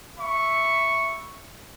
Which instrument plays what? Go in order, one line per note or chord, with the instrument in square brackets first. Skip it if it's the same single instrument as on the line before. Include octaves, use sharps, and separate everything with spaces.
[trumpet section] E5 B5 C#6